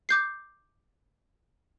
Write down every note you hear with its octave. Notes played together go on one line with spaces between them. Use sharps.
D6 G6 C7